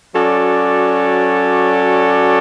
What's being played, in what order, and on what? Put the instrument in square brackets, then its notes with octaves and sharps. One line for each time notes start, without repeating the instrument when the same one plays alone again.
[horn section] F#3 C#4 F#4 A4 D5